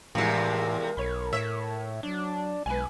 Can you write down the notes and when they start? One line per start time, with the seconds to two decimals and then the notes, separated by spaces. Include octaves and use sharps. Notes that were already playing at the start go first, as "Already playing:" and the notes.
0.15 E2 A2 C3 F3 G#3 E4 A#4
0.97 B1 C#5 B5
1.33 A2 C#5 E5
2.03 F#3 D4
2.66 B1 G#3 B4 G#5